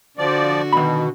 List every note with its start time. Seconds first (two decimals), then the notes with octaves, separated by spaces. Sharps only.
0.18 D3 F3 F#4 D5
0.73 B2 D#3 B5